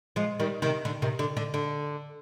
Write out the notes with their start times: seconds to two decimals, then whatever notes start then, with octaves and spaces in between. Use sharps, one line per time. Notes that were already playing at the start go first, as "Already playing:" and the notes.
0.16 F3 G#3
0.40 D#3 G3
0.62 C3 D#3
0.85 D3
1.02 C3 D#3
1.19 D3
1.37 D3
1.54 D3